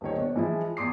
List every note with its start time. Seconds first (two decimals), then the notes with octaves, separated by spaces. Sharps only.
0.01 D#1 A#2 D#3 C#5
0.15 B2 D4
0.36 E3 F3 G#3 E4
0.77 E2 C6 D6 D#6 C7